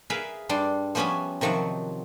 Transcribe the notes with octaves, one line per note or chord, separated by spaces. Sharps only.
G#4 A#4 B4 E5 F5
G2 G3 D4 C6
F3 G3 B3 C#4 E5 G#5
C3 D#3 F3 F#3 F#5